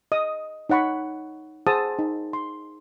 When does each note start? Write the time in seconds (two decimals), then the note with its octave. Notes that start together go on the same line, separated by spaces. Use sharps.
0.12 D#5 D#6
0.69 D#4 C#5 F#5 B5 C#6
1.67 G#4 C5 F#5 A5 D#6 E6
1.99 D#4
2.33 C6